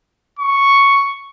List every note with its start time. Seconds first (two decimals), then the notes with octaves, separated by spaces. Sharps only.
0.40 C#6